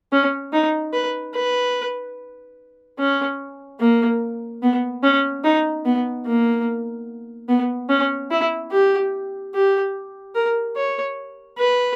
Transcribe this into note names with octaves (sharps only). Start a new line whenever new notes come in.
C#4
D#4
B4
B4
C#4
A#3
B3
C#4
D#4
B3
A#3
B3
C#4
E4
G4
G4
A#4
C#5
B4